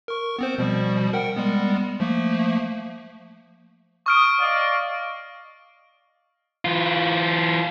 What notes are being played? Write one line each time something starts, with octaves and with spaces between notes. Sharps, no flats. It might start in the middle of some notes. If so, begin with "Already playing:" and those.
A#4 C#6
B3 C4 C5
B2 F3 G3
A#4 F#5 G5
G3 G#3 B3
F3 A3 A#3
C#6 D#6 F6 D7
D5 D#5 F5
E3 F4